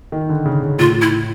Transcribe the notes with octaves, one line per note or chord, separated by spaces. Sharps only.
D#3
D3
C#3
C#3
A2 F4
E4